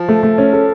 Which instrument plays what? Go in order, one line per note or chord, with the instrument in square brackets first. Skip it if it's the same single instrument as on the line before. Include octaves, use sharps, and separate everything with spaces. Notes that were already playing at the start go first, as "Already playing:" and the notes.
Already playing: [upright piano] F3
[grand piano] A3
A3
C#4
A4